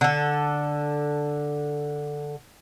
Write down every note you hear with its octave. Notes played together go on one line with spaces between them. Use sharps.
D3 A4